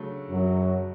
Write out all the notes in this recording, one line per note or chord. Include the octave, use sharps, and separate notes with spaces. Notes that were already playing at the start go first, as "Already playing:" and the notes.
Already playing: C#3 F#3 A3 D4
F#2 F#3